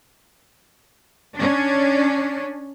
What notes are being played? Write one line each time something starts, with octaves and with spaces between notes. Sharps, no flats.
C#4 D4